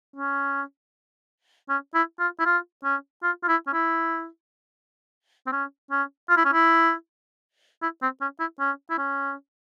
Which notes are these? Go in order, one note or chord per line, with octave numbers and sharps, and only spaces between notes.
C#4
C#4
E4
F4
E4
F4
C#4
F4
F4
E4
C#4
E4
C4
C#4
C#4
F4
E4
C#4
E4
E4
C4
C#4
E4
C#4
E4
C#4